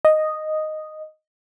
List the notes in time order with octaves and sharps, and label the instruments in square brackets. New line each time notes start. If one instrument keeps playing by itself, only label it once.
[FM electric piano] D#5